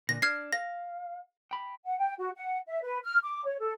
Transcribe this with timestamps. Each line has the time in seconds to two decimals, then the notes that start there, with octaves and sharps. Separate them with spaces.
0.09 A#2 D3 A#6
0.22 D4 F6 G#6 C7
0.53 F5 A#6
1.51 G5 B5
1.85 F#5
1.98 G5
2.18 F#4
2.36 F#5
2.67 E5
2.82 B4
3.04 F6
3.24 D6
3.45 C#5
3.59 A4